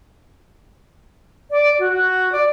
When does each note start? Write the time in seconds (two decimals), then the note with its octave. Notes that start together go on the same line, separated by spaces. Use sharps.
1.51 D5
1.79 F#4
1.92 F#4
2.32 D5